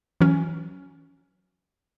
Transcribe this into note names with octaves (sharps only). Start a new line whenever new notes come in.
E3 F#3 C#4